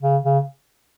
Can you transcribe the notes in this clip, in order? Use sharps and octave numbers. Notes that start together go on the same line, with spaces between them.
C#3
C#3